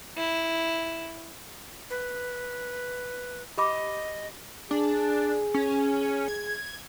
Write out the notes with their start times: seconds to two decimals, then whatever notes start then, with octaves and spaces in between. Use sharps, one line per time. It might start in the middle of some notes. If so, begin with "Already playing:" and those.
0.17 E4
1.90 B4
3.58 G4 D#5 B5 D6
4.71 D4 G#4
5.54 C#4
6.28 G#6